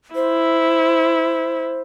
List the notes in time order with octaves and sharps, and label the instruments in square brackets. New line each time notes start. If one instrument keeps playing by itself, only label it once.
[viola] E4 [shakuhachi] C5